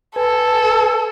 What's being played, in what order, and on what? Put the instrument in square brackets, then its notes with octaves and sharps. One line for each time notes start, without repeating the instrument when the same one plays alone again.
[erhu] A4 [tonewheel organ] B4 G#5